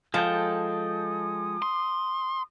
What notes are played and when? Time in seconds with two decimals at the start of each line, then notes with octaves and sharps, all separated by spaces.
0.14 F3 G#3 A4 G5 D#6
1.62 C6